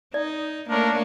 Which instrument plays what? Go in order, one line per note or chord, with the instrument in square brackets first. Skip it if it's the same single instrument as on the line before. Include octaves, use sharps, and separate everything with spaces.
[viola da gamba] D#4 [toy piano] D5
[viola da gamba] A3 A#3 C#5 [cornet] D4 [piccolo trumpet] A#4